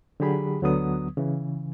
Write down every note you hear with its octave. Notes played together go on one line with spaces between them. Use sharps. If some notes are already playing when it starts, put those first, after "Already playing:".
D3 F#3 G4 G#4 B5
D2 D3 F#3 B3 D#6
C#3 E3